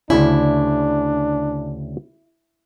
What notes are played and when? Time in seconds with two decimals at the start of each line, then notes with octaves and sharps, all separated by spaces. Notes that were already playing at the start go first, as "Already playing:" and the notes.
0.10 D2 C#3 C#4 D4 E4